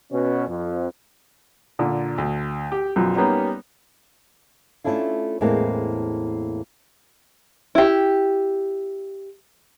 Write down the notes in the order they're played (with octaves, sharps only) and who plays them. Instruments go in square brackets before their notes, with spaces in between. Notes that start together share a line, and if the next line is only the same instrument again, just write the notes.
[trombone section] B2 C#4
F2
[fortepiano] A#2 D3
D2
G4
B1 F#2 F3
G3 A#3 B3 C#4 D#4
[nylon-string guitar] A3 A#3 C#4 D4 E4 F4
E2 A2 G#3 A#3 C4
[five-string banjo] E4 G4